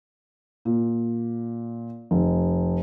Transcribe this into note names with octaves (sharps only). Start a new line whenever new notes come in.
A#2
F1